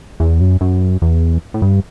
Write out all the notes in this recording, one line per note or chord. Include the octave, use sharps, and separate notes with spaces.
E2
F#2
F#2
E2
A2
G2